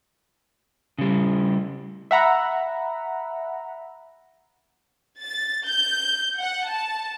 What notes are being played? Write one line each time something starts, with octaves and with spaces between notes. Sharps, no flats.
C#3 G3
E5 F#5 A#5 B5
A6
G6
F#5
A5